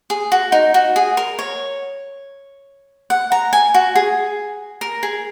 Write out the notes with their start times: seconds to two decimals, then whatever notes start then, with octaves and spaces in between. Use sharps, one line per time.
0.10 G#4
0.32 F#4
0.52 D#4
0.74 F#4
0.96 G#4
1.17 A#4
1.39 C#5
3.10 F#5
3.32 A#5
3.53 G#5
3.74 F#4
3.96 G#4
4.81 A#4
5.03 G#4